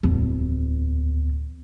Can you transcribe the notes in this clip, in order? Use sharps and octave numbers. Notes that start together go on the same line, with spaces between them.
D1 E2